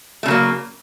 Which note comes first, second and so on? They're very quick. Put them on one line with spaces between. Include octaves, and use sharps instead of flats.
A3 C#3 F#3 A#3